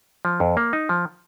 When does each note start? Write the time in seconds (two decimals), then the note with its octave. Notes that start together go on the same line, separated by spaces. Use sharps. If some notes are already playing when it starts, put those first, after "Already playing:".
0.25 F3
0.40 F2
0.57 A#3
0.73 D#4
0.89 F3